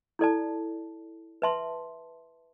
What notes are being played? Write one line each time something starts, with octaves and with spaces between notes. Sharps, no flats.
E4 A4 D5 A5
B4 E5 A5 C6